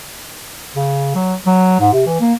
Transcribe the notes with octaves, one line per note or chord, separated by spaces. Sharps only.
C#3
F#3
F#3
G#2
C3
E3
A#3